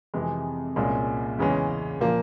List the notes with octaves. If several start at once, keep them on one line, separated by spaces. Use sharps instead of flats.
F2 C3 E3 G#3
C2 A#2 G#3 C#4
E2 C#3 E3 G#3 C#4
A#2 F3 A#3 F4